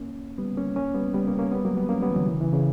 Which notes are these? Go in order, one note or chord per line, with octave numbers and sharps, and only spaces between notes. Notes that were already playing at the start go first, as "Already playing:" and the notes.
Already playing: A#3 C#4
G3 B3
A#3 C#4
A#3 C#4
G3 B3
G3 B3
A#3 C#4
A#3 C#4
G3 B3
F#3 A#3
G3 B3
A#3 C#4
G3 B3
E3
D3 F#3
C#3 E3
C#3 E3
C#3 E3